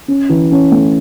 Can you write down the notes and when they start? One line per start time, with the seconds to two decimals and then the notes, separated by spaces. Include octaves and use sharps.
0.08 C#4
0.29 E3
0.52 C#4
0.72 A3